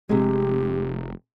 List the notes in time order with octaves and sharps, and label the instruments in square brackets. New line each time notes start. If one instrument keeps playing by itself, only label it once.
[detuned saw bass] F1 [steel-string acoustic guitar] C3 G#3 [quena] G4